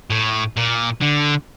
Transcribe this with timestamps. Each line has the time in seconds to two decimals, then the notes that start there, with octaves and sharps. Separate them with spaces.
0.10 A2
0.57 A#2
1.02 D3